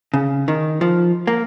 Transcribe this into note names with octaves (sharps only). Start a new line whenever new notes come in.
C#3
D#3
F3
A#3